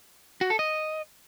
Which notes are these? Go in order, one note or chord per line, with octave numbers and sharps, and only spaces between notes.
F#4
A4
D#5